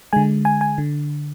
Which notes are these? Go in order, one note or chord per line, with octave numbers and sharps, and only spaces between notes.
D3 G#3 G#5
G#5
G#5
D3